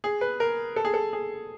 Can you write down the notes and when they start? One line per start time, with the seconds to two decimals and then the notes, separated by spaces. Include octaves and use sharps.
0.04 G#4
0.21 B4
0.40 A#4
0.76 A4
0.85 G#4
0.94 A4
1.13 G#4